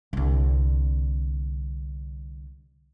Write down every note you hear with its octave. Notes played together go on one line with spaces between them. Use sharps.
C2 D3